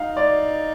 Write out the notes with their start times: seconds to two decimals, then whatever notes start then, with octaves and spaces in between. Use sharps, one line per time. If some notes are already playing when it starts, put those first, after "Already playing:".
Already playing: D#4 F5
0.17 D5